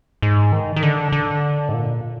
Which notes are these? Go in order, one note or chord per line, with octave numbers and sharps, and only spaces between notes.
G#2
D#3
D#3
D3
D3
G#2
A#2